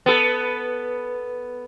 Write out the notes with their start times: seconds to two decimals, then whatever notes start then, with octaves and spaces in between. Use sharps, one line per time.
0.06 B3 A4